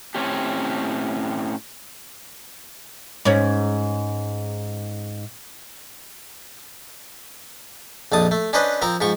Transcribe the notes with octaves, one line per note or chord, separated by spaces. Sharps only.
A2 C4 C#4 G4
G#2 C#4
A#1 F2 A5 D#6
A3
C#4 D4 B4 C5 D#5
F3 C4 A#4
G#2 F3 C#6